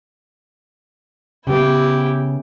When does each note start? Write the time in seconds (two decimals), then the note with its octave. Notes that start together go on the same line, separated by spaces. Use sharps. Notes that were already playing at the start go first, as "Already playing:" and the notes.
1.47 C#3 B3 E4 G4